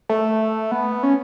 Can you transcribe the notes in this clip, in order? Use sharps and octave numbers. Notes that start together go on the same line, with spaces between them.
A3
B3
C#4